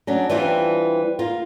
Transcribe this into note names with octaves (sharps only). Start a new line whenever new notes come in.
F#3 C#4 D4
E3 G3 C4 D4 F4
A#3 F4